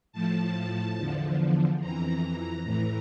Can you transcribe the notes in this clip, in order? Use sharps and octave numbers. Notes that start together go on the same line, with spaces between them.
A2 F3 A5
E2 D3 F3
F2 E3 A#5
A2 E3